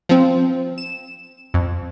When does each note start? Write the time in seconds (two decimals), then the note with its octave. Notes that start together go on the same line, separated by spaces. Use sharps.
0.09 F3 C4
0.78 E7
1.54 F2